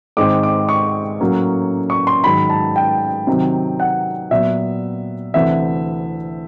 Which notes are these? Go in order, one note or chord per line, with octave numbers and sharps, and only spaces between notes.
G#2 D#3 G#3 C4 D6
D6
C#6
A2 F#3 A#3 C#4
C#6
C6
G#2 D#3 F#3 B5
A5
G5
C3 D#3 F#3
F#5
A#2 F#3 B3 E5
D2 C3 E3 E5